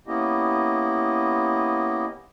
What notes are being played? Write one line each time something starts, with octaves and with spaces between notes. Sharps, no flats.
A#3 B3 C#4 E4 G4 D#5